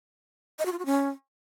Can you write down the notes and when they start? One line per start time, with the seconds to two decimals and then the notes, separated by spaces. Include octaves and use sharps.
0.59 D#5
0.66 F#4
0.72 F4
0.79 F#4
0.86 C#4